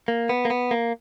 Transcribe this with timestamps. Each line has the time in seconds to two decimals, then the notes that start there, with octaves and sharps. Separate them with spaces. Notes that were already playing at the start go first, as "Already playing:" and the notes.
0.08 A#3
0.29 B3
0.45 A#3
0.50 B3
0.71 A#3